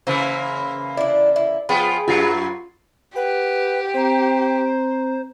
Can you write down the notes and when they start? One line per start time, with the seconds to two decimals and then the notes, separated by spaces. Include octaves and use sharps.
0.07 C#3 E3 A#3 C5
0.97 D4 E4 D5
1.36 E4
1.69 F3 B3 F4 G#4 G5 B5
2.08 F#2 F#3 F4 A6 C7
3.16 G4 B4 F#5
3.94 C4 C5 A#5